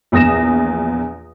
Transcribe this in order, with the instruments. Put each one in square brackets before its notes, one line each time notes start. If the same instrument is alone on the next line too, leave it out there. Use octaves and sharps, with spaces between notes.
[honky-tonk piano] A#1 E2 D#6 A#6 E7